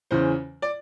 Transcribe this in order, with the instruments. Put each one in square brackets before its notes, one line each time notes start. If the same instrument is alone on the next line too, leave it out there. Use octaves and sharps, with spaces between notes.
[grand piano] E2 C#3 E3 C5
D5